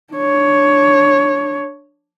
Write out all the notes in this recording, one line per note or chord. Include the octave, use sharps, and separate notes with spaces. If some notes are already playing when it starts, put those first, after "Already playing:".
D4 C#5